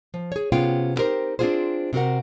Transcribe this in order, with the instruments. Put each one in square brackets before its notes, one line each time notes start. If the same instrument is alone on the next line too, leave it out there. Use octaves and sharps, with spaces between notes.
[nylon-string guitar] F3
G#4 C#5
C3 B3 C#4 F4 G#4 G5
B3 C4 D#4 G4 A#4 C5
C4 D4 D#4 F4 G#4 C5
C3 C4 F#4 A#4 F#5